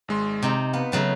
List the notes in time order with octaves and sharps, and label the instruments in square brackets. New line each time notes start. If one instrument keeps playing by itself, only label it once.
[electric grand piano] G#1 G#3 C6
[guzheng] C3 D#4
[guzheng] B3 [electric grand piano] F5
[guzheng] C#3 F#3 A3